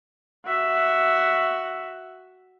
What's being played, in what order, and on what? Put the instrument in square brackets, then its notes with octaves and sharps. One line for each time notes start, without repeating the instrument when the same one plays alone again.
[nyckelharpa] F#4 E5